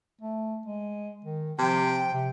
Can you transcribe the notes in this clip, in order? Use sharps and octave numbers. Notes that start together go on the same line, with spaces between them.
A3
G#3
D#3
C3 F3 G5
C3